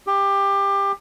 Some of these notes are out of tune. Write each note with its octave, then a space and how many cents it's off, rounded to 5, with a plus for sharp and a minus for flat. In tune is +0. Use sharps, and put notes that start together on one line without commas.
G4 +20